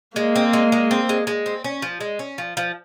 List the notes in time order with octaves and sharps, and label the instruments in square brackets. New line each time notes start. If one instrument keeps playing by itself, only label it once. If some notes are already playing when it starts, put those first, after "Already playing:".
[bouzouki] G#3 [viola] A#3
[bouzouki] C4
G#3
G#3
C4
G#3
G#3
C4
C#4
F3
G#3
C#4
F3
F3